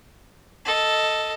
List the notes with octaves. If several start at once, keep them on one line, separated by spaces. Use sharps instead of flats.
A4 D#5